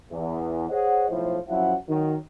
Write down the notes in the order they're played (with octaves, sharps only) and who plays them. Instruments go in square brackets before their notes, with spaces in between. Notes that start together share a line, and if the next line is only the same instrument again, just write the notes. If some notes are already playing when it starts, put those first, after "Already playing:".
[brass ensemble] E2
G#4 C5 C#5 D#5 F#5
B1 A2 F3 E4 C5
F#2 F3 F#3 E4 E5 F#5
D#3 F#3